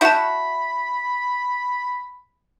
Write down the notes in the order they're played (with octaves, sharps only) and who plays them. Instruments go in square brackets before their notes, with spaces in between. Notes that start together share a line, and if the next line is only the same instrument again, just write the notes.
[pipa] E4 F#4 [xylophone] A5 G6 [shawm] B5